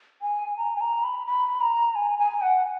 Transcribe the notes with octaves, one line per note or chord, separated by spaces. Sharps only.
G#5
A#5
G#5
A#5
B5
B5
A#5
G#5
G#5
F#5